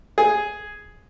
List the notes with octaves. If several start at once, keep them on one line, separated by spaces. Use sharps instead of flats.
G#4